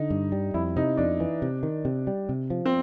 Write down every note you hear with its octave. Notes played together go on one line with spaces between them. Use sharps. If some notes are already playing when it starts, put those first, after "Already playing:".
Already playing: D3 D#4
G2
G3
F2 E4
C3 D#4
F2 D4
E3
C3
D#3
C3
G3
C3
F3
C4